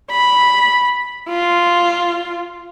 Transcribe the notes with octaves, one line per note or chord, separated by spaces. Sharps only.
B5
F4